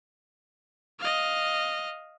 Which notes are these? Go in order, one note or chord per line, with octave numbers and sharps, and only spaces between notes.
D#5 F5